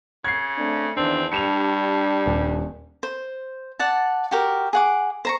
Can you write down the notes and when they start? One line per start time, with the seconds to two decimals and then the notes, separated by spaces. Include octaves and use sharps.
0.24 C#3 G#6 C7
0.58 A3 C4 D4
0.97 E2 D#3 C4 D4 A5
1.32 G2 G3 D4 C#7 E7 F7
2.26 D#1
3.03 C5
3.79 D5 F#5 A5
4.31 F#4 G4 A#4
4.73 G#4 F#5 D6
5.25 C5 A#5 C#6